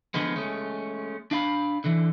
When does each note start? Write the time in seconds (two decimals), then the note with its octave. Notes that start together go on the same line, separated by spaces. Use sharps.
0.14 D3 F3 G#3 B3
0.36 G#3 A3 C#4
1.31 D4 F5 B5
1.84 D3 E3